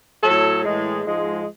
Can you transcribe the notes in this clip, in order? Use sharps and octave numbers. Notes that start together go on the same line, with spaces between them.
A2 F#3 A4
A2 E3 G#3
G#2 F3 G#3